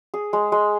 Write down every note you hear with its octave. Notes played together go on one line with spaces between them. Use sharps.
G#4
G#3
G#3